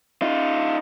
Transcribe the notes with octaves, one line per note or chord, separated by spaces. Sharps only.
D#4 F4